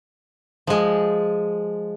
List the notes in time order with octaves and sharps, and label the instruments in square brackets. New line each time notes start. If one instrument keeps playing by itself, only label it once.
[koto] F3 G#3